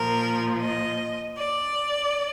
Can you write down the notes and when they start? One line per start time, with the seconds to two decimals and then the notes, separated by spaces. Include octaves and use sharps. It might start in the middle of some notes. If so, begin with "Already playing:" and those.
Already playing: A#2 F3 A#4
0.61 D#5
1.38 D5